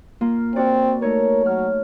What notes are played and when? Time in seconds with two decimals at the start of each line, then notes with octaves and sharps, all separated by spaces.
0.21 A#3 F4
0.56 C4 F#4 D5
1.02 A3 D#4 A#4 C#5
1.46 F#3 F6